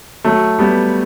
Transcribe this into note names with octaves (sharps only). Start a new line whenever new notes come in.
F#3 A3
G3 B3